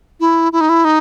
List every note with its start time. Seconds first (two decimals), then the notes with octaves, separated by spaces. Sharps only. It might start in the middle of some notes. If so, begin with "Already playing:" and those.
0.20 E4
0.53 E4
0.61 D#4
0.69 E4
0.85 D#4